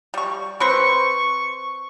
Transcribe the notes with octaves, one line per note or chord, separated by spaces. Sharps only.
G3 C#6
C4 B4 C5 C#6